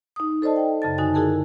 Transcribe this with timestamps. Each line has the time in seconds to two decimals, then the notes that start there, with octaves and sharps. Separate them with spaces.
0.16 D#4 D#6
0.42 A4 C5 D5 D#5 A5
0.56 G5
0.82 F#2 C#3 A5 A6
0.98 D3 D#4 F#4 G#5
1.14 E4 F#4 G#4 A#4 A5